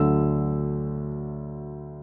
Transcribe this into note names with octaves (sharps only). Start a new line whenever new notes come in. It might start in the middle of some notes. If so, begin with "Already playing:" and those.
Already playing: D2 D3 F#3 E6